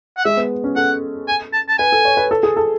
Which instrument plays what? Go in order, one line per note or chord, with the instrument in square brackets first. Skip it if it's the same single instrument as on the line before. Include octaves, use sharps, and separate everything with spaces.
[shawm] F#5
[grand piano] G#3 [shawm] E5
[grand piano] B3
C#4
[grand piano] A4 [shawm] F#5
[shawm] G#5
A5
A5
[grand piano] B4 [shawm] G#5
[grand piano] A4
C#5
B4
A4
G#4
A4